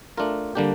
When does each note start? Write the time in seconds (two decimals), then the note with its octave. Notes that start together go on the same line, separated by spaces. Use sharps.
0.17 A3 D4 F4 A#4
0.55 D3 G3 A#3 D4 G4